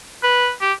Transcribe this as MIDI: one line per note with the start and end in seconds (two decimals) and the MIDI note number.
0.23 0.51 71
0.61 0.73 67